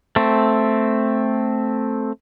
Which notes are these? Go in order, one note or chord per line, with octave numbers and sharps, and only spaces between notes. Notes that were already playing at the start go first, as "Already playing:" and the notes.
A3 C4